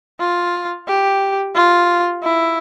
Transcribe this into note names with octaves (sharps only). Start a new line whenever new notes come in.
F4
G4
F4
E4